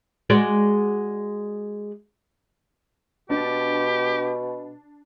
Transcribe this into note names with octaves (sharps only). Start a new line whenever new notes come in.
G#3 F#4 D5
B2 D4 G4